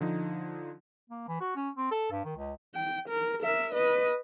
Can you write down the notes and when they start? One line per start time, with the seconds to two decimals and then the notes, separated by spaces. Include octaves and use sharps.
0.01 D3 F3 D#4
1.10 A#3
1.28 E3
1.41 F#4
1.56 C#4
1.77 C4
1.91 A4
2.11 G2
2.25 D#3
2.37 C#2
2.74 G5
3.08 A#4
3.42 A#4 E5
3.73 B4 D#5